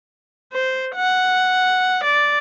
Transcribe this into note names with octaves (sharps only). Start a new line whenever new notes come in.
C5
F#5
D5